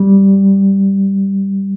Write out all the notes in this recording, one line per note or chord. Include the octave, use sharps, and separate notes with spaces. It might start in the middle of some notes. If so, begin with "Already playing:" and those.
Already playing: G3